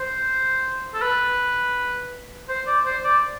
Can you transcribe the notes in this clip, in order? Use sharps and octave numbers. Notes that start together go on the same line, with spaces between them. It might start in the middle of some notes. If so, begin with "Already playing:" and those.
Already playing: C5
A4
B4
C5
D5
C5
D5